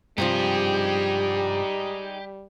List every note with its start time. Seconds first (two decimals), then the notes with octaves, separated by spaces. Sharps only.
0.18 G2 C3 F3 G3 D#4 G4 G#4